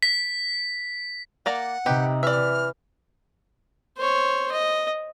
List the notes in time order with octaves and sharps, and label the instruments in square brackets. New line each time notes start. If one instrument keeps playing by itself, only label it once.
[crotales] B6
[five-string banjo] A#3 D5 A#5 [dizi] F#5
[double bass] C3 [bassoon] D#4 [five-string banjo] G4 B4
[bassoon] E3 [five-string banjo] D5 E5 [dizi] F6
[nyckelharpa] C5 C#5
D#5